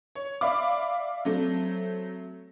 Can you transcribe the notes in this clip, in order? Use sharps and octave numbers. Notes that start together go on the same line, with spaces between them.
C#5
D5 E5 F5 B5 D6
F#3 A3 C4